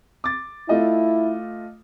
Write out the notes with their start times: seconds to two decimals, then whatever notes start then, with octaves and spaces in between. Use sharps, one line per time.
0.24 D6 A6
0.69 A3 E4 F4 D#5